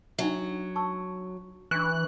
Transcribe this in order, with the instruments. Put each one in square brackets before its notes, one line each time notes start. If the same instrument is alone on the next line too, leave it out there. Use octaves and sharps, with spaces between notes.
[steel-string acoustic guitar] F#3 [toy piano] D4 D#4 E5
[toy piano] A5 C#6 E6
[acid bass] E3 [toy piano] D4 C#6 [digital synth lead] F#6